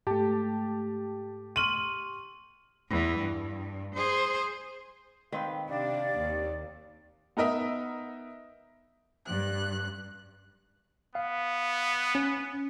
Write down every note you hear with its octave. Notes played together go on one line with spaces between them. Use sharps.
G#2 A3 G4 A5
C6 C#6 F6 D#7 F#7
E2 E3
G2
G#4 C5
D#3 C4 B4 F5
C3 D4 D5 F5
D#2
B3 D#4 A#4 D#5 E5
G2 F#6
B3 F5
C#4